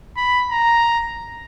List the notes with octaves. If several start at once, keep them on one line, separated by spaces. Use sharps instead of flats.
B5
A#5